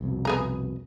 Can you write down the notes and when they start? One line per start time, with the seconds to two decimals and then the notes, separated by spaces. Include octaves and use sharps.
0.01 C2 F2 B2
0.25 B3 G#4 A#5